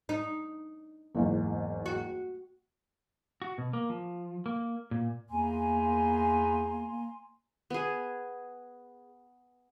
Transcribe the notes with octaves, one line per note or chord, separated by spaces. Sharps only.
D#4
F#1 E2 G#2
F#4
F#4
B2
A#3
F3
A#3
A#2
E2 A#3 G#5 A#5 C6
B3 G#4